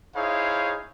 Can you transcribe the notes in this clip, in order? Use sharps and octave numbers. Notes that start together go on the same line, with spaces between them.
D#4 E4 G#4 C5 C#5 F5